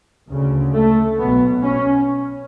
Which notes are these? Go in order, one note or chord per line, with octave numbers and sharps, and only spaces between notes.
D2 C#3
A3
B1 B2 B3
C#4